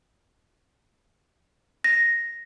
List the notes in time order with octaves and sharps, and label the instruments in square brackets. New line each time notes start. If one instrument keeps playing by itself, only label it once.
[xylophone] A#6